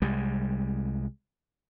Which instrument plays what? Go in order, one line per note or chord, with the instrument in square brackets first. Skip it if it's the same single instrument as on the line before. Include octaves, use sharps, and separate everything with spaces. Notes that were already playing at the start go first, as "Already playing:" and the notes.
[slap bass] C2 G3 G#3